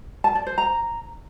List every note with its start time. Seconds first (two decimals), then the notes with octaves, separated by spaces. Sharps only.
0.24 A5
0.35 D5
0.46 C5
0.58 A#5